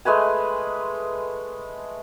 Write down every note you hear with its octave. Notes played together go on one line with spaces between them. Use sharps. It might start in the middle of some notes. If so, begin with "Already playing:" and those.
G#3 A3 B4 G#5